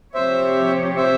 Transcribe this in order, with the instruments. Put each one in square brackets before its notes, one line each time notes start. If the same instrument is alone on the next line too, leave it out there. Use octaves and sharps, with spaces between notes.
[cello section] C3 F3 C4 G4 C#5 [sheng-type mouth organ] C5 E5
[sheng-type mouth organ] C5 E5